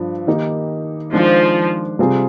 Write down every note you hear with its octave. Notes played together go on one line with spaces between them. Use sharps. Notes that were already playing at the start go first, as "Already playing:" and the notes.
Already playing: G2 F3 D4
D#3 A#3 D#4 G4
D#3 F3 G#3 D4
C3 G3 C4 F4 G#4